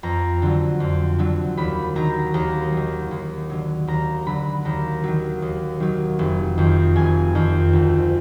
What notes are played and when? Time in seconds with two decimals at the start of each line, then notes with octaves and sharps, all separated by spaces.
0.03 F2 A#5
0.42 D3 F#3
0.80 F2
1.19 D3 F#3
1.57 D#2 B5
1.96 D#3 F#3 A#5
2.34 D#2 A#5
2.72 D#3 F#3
3.11 D#2
3.50 D3 F#3
3.87 D#2 A#5
4.26 D3 F#3 B5
4.65 D#2 A#5
5.04 D#3 F#3
5.42 D#2
5.80 D#3 F#3
6.19 F1
6.58 F2 D#3
6.96 F1 G#5
7.35 F2 D#3
7.73 D2